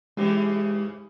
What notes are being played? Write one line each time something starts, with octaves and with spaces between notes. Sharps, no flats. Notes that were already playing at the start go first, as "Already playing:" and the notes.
G#2 C#3 E3 G#3 G4